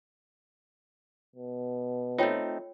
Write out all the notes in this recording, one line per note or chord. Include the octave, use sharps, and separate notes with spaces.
B2
A3 C4 D#4 F4 C#5 G5